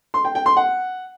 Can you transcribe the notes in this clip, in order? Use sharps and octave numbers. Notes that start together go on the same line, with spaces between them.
C6
G5
G5
C6
F#5